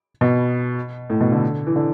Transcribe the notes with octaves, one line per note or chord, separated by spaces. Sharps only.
B2
A2
B2
D3
E3
D3